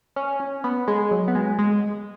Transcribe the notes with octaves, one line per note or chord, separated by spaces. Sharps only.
C#4
C#4
B3
G#3
F#3
B3
G#3
G#3